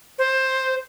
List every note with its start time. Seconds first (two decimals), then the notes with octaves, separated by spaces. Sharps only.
0.19 C5